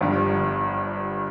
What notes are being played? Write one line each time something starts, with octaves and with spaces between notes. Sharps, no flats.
G1 G2 F3